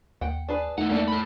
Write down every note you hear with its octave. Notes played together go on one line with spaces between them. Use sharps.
D#2 F#5 G5
D4 G#4 B4
E2 D#3 A3 D#4 F#5
A#3 D4 G4 A4
A4 B5